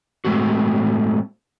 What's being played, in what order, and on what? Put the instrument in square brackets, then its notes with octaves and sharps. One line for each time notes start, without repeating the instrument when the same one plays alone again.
[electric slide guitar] A2 G#3 A3 C4 F#4